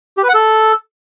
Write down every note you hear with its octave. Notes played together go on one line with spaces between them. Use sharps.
G4
B4
F#5
A4